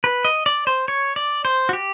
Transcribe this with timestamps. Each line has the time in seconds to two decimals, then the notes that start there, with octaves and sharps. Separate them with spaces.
0.04 B4
0.25 D#5
0.46 D5
0.67 C5
0.88 C#5
1.16 D5
1.45 C5
1.69 F#4
1.73 G4